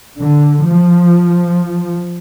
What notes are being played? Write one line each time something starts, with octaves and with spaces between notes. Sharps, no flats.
D3
F3